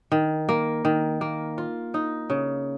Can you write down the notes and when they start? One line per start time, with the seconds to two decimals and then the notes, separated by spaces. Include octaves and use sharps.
0.12 D#3
0.49 A#3
0.85 D#3
1.21 A#3
1.58 F4
1.94 D#4
2.30 C#3